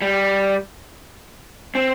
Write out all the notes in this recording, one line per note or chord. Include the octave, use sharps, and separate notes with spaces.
G3
C4